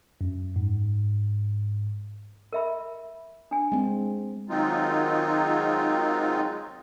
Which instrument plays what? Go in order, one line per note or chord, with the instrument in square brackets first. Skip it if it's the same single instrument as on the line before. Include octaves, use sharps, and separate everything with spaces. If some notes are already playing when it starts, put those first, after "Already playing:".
[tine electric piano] F#2
G#2
[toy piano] A#4 E5 B5
D4 G#5
[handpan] G#3 C4
[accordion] D#3 F#3 G#3 C4 D#4 F4